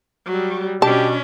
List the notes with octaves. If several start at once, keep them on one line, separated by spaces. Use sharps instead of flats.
F#3 G3
B2 C#4 D4 G4 A5